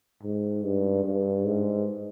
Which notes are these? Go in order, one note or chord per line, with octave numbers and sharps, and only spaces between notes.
G#2
G2
G2
G#2